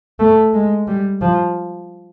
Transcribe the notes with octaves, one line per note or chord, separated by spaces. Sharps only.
A3
G#3
G3
F3